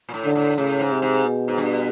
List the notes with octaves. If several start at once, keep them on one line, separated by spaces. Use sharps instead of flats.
A#2
A2
D3
A2
A2 C#3
G#2
C3
G#2
B2
G#2
G2